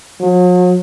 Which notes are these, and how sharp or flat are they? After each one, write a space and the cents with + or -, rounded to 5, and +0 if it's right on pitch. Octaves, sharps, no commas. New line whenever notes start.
F#3 -45